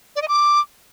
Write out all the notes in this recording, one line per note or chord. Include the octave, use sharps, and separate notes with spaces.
D5
D#5
D6